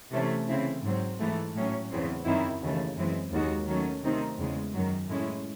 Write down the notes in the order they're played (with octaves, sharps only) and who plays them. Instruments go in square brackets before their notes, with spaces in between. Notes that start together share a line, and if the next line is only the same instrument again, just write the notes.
[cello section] C3 E3 A3 C#4
C#3 E3 C4 E4
G#2 F#3 C4
G#2 E3 A3
A2 F#3 C#4
E2 C#3 E3 C4
F#2 D#3 F#3 C4 E4
D#2 C#3 E3 A3
F#2 E3 G#3 C4
D#2 D#3 G#3 D#4 F#4
D#3 F#3 A3 C#4
C3 D#3 A3 C4 D#4
E2 C#3 G#3
F#2 D#3 F#3
A2 G#3 C#4 E4